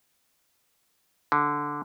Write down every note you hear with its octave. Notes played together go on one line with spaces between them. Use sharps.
D3